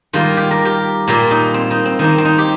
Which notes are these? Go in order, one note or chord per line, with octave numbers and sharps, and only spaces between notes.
D#3 G3 A#3 F4
G4
A#4
G4
A#2 G3 A#3 F4
D#4
C4
D#4
C4
D#3 A#3 D#4
C4
D#4
G4